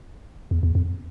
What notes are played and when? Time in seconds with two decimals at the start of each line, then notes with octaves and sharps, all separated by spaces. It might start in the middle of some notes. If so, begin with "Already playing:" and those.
0.51 E2
0.63 E2
0.75 F2